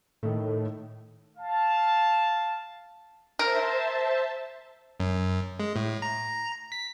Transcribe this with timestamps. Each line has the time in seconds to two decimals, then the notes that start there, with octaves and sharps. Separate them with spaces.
0.23 A2 D#3 A3
1.37 F5 A5
3.39 A#4 C5 E5 A5
5.00 F#2
5.60 G#3
5.76 A2
6.02 A#5
6.72 B6